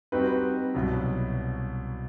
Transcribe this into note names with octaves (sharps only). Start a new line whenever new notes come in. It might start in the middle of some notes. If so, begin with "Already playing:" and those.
G3 C4 D#4 F#4 B4
C2 B2 F#3